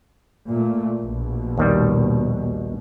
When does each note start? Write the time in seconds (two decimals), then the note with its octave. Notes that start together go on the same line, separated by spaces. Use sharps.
0.51 A#2 A3
0.99 A#1 B2
1.58 D#2 D#3 G3